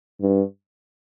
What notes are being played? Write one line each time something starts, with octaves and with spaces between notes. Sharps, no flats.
G2